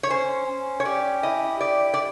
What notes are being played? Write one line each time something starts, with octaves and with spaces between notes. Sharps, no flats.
C#5
C#4 C5
C#4
C#5
G4 D5
E4 D#5
G4 D5
D5